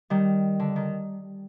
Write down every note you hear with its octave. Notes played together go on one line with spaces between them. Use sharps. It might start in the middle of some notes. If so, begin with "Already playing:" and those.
D#3 G3
D3
D#3